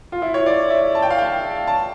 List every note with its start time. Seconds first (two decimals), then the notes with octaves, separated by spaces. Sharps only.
0.12 F4
0.22 E4
0.34 C#5
0.46 D5
0.70 E5
0.95 A5
1.02 G5
1.10 F5
1.18 G5
1.67 A5